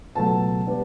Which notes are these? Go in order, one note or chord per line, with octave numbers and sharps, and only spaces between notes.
C#2 B2 F#3 A3 A5
G3 B3 D4